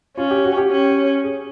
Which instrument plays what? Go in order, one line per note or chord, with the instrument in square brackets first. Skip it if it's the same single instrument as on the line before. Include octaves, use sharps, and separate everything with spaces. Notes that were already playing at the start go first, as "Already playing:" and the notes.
[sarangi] C#4 [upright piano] F4
[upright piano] G4
F#4
G4
[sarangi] C#4
[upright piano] G#4